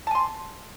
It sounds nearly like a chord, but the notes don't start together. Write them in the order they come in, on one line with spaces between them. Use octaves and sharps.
A5 G#5 C6